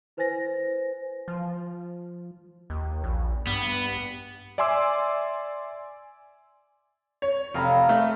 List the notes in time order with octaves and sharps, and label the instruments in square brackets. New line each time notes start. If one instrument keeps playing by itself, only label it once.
[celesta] E4 B4 C5 G#5 A6 A#6
[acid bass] F3
D#2
A#1
[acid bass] G2 [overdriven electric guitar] B3
[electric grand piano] D5 E5 G#5 C6 D6 E6
[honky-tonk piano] C#5
[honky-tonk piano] F1 [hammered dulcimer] F5 A#5 B5
[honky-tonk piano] A3